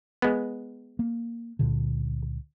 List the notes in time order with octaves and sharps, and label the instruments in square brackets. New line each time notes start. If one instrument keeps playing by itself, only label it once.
[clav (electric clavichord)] G#3 B3
[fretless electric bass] A#3
C#2 A#2 D3